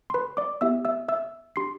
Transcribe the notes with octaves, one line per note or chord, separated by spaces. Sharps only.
C6
B4 B5
D5 D6
B3 E4 G4 E5 E6
E5 E6
E5 E6
D4 G4 C6 C7